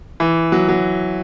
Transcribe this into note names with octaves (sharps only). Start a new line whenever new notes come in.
E3
F#3
F#3